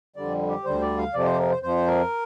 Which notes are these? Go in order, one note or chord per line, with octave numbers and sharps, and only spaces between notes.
F2 D3 G3 D5
G4
D2 D3 G3 C5
D5
F5
F2 C3 F3 D5
C5
G4
A#4
C5
F2 F3 C5
A#4